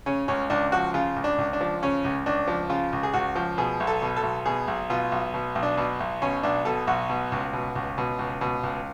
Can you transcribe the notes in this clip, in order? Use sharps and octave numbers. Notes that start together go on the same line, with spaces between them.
C#3 C#4
C#2 C#4
C#2 D4
F3 F#4
C#3 F4
C#2
D4
C#2
D4
F3
C#3 C#4
C#2
C#2 D4
F3
C#3 F4
C#2
G#4
C#2 F#4
F3
B2 G#4
B1
A4
B2
A4
B1
B2 G#4
B1
B2 F4
B1
B2
B1
D4
B2
B1
B2 C#4
B1 D4
B2 A4
B1 F#4
B2
C#2
B2
C#2
B2
C#2
B2
C#2